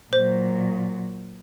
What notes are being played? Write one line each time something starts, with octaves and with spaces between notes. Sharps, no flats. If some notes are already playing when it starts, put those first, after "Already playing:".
A#2 F#3 C5